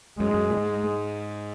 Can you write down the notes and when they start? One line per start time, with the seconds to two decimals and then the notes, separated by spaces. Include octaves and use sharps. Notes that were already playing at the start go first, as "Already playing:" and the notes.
0.20 F#2 G#3
0.27 G#2
0.34 F#2
0.50 A#2
0.57 G#2